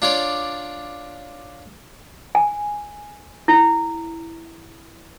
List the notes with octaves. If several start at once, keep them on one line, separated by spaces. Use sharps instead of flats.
D4 F4 C#5 D5
G#5
E4